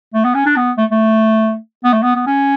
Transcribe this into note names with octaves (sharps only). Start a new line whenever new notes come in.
A3
B3
C#4
D4
B3
A3
A3
B3
A3
B3
B3
C#4